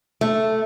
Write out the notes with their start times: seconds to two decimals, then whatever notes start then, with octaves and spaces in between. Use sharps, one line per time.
0.21 A3